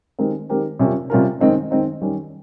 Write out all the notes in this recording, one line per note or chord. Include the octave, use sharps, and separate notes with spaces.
D#3 G#3 C4 G4 A#4
D#3 G#3 C4 G4 A#4
C3 G3 C#4 F4 A#4
C3 G3 C#4 F4 A#4
D#3 G#3 C4 D#4
D#3 G#3 C4 D#4
D#3 G3 C#4 G4